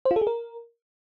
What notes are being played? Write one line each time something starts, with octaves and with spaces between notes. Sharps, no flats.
C5
F4
A4
G#4
A#4